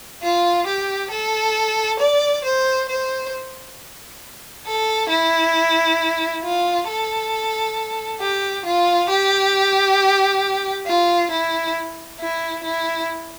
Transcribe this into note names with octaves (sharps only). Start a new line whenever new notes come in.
F4
G4
A4
D5
C5
C5
A4
E4
F4
A4
G4
F4
G4
F4
E4
E4
E4